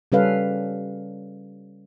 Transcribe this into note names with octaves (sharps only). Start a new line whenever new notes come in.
C#3 G3 C#4 A4 B4 F5